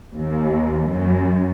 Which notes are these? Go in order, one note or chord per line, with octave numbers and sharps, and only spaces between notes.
D#2
F#2